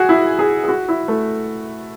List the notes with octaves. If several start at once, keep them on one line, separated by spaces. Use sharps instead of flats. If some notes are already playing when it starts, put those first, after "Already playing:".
Already playing: F#4 G#4
E4
G#4
G#4
F#4
E4
A3